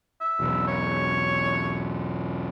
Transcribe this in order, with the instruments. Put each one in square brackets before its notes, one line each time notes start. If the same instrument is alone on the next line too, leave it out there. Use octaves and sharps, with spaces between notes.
[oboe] E5
[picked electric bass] E1 B1
[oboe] C#5